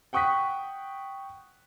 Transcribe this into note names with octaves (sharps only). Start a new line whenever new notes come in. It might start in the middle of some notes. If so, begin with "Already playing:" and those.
F#5 G5 C#6 D#6 F#6 B6